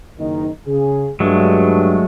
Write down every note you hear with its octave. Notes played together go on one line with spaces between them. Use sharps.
F#1 D#3 D#4
C#3 G#4
G2 F#3 G#3 A3